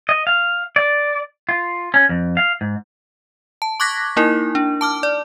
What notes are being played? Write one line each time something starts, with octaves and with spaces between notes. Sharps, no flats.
D#5
F5
D5
F4
C#4
F2
F5
G#2
A5
C#6 D6 F#6 G#6 A#6 B6
A#3 D#4 E4 A#4
D4
A5 D6 F6
D5